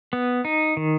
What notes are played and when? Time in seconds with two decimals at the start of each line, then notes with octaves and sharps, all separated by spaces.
0.13 B3
0.45 D#4
0.77 D#3